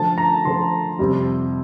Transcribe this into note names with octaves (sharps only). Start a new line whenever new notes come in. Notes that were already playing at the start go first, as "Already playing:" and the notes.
Already playing: D3 F3 A3 A5
A#5
D3 F3 A3 C6
F2 C3 G3